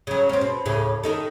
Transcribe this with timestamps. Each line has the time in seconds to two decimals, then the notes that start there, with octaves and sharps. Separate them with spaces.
0.07 C#3 F#3
0.29 C4 C#4
0.41 B2
0.65 D2 A2 C#3
1.03 D#3 D#4 A4